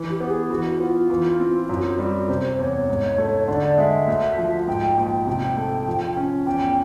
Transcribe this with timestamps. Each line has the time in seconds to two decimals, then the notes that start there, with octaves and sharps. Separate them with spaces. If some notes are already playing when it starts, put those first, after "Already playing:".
Already playing: E3
0.10 G4
0.20 B3
0.30 G#4
0.50 E3 F#4
0.80 B3 F4
1.10 E3
1.40 C4
1.69 F#2 F4
1.78 F#4
1.87 F4
1.99 G3 F#4
2.29 C3 C5
2.59 E2 C#5
2.89 G#2
3.18 A3
3.48 D3 D5
3.78 G#3 E5
4.07 D2
4.38 F3
4.67 G#2 G5
4.97 A#1 G5
5.27 C3 G5
5.57 A3
5.87 F3
6.17 C#4
6.46 E2 G5